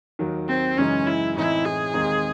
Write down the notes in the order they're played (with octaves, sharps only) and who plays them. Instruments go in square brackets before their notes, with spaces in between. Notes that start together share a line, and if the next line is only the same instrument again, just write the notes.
[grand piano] D#2 D#3 F#3
[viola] C4
[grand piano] F#2 C#3 E3 G#3 D#4 [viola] C#4
[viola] E4
[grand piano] A2 E3 C4 D#4 [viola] E4
[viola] G#4
[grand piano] D#2 D#3 G#3 C4 D#4